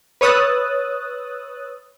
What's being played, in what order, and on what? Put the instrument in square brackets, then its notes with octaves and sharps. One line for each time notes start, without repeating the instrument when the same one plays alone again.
[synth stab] B4 C#5 D#6 E6 F#6 A6